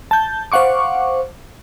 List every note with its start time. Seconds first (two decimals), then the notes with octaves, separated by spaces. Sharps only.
0.11 A5 G6
0.52 C5 F5 F#5 C#6 D6